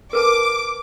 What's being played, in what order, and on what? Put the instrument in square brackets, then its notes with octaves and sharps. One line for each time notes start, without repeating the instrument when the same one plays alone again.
[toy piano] A#4 B4 A5 [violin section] D6